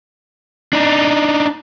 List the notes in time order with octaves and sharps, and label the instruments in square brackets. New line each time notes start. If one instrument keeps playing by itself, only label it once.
[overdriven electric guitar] D4 D#4